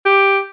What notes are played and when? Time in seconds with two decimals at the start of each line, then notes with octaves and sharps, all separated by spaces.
0.06 G4